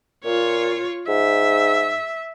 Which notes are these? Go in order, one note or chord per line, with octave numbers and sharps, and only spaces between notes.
A#2 F4 C#5
G#2 E5